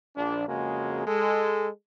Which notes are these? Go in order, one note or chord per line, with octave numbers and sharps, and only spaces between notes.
A#1 D4
F2 C#3 G#3 A#3 F#4
G#3 A4